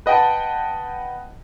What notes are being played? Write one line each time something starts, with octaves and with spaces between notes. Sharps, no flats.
B4 D#5 F#5 G5 A5